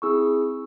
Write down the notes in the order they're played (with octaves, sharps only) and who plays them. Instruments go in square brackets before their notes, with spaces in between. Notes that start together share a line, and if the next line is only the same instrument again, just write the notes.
[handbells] C4 E4 G#4 C#6 E6